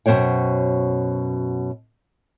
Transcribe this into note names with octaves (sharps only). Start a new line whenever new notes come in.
F#2 B2 F#3 C5 C#5 G5